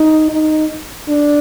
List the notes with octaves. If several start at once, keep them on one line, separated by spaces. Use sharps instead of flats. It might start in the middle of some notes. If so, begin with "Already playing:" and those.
Already playing: D#4
D#4
D4